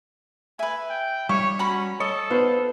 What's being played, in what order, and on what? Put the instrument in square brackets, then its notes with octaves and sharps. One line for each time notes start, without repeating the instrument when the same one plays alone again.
[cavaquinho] B4 E5 [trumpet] G#5
[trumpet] G5
[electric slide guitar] G3 [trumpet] C#5 [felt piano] C#6
[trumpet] C#4 [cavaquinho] F#4 A#5 B5
[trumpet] A4 [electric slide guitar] C#5 [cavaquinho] D#5
[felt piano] B3 [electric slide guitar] F4 C5 D5